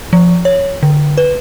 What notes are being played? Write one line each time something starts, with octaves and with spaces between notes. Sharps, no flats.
F3
C#5
D3
B4